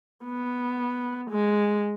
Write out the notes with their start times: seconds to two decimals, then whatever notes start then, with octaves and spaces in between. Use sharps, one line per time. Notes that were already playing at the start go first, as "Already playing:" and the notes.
0.25 B3
1.31 G#3